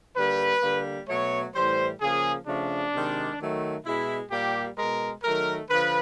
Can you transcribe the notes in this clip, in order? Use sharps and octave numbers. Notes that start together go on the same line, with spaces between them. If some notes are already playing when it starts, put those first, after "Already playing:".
D3 G3 A#3 B4
D3 G3 A#3
B2 F#3 A3 C#5
A2 E3 G3 C5
C#3 F3 A#3 G#4
C#3 F3 A3 D4
C3 D#3 G#3
D#3 F#3 A3
B2 G#3 E4
A#2 G3 A#3 G4
B2 G#3 A#4
D#3 F#3 A3 A#4
D3 F3 B4